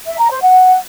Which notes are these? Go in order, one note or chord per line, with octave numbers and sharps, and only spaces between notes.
E5
A#5
C5
F#5